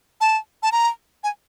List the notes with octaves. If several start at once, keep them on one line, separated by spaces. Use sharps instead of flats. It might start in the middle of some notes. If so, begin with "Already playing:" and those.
A5
A5
A#5
G#5